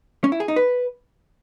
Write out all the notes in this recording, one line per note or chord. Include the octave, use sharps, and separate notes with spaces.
C#4
E4
G#4
D#4
B4